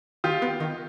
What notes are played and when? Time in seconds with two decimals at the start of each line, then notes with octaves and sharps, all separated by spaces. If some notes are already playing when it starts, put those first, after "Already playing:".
0.24 D#3 F4 G4
0.42 B3
0.60 D#3